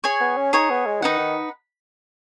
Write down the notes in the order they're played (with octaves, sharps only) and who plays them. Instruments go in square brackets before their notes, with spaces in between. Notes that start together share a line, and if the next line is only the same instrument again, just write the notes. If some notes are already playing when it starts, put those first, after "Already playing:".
[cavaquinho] G#4 C#5 G#5 C#6
[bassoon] B3
C#4
[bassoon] D#4 [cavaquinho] G#4 C#5 G#5 C#6
[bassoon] B3
G#3
[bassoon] D#3 [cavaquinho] D#4 B4 F#5
[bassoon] D#3